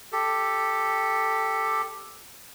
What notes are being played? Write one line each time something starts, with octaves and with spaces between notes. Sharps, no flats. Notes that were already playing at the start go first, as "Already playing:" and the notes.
G4 A4